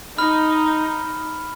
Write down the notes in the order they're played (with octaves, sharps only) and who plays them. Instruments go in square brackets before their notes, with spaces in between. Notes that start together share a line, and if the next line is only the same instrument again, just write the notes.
[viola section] D#4 [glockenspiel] B5 F6